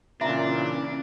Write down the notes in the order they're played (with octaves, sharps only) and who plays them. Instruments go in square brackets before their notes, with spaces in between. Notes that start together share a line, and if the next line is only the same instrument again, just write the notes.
[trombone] A#2 [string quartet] C#3 E3 [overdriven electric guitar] D4 [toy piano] E5 A#5